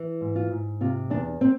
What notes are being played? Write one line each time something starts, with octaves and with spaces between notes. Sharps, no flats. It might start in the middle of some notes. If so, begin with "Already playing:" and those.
Already playing: E3
G#2
F4
G#2
C3 F4
E2 D4
C4